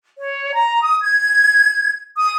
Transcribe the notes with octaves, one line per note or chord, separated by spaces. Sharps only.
C#5
A#5
D#6
G#6
D#6